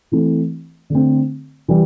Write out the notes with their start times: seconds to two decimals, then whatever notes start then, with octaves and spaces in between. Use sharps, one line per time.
0.12 E3 A3 C4 E4
0.90 D3 A3 C4
1.68 E3 G3